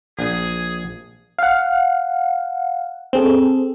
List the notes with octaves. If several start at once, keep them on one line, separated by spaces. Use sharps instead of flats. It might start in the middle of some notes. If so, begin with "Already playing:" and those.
A#1 G#4
F5 F#5
C4 G#4 A4